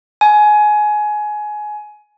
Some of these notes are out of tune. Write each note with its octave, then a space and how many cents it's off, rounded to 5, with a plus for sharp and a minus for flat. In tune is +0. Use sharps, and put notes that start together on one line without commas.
G#5 +20